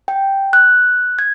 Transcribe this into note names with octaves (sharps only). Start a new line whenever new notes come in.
G5
F#6
G#6